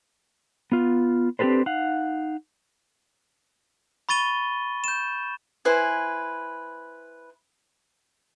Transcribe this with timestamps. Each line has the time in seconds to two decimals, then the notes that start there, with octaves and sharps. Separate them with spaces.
0.72 B3 F4
1.39 C4 D4 G4 A4 B4 C5
1.66 D#4 F5 F#5
4.09 B5 C#6 A6 D#7 G7
4.84 G6 E7
5.65 E4 B4 C5 G#5